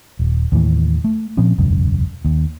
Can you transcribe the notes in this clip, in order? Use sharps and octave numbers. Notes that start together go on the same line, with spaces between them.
D#1
D#2 A2 E3
A3
A#2 F3 C4 C#4
E1 C#2 F#2
D#2